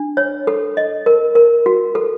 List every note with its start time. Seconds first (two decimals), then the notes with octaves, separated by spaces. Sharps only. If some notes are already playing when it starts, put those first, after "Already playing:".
Already playing: D4
0.17 C#5
0.47 A4
0.77 D#5
1.06 A#4
1.35 A#4
1.66 F#4
1.95 A4